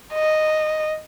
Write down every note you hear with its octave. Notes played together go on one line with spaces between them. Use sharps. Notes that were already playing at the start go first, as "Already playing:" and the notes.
D#5